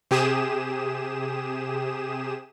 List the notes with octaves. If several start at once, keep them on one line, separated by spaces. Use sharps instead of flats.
C3 G4 G#4 D#6 E7